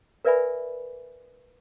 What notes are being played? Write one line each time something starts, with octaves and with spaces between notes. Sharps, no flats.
A#4 B4 D5 E5 G#5 B5